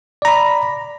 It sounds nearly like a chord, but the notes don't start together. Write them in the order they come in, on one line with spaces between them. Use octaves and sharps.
D5 A#5 B5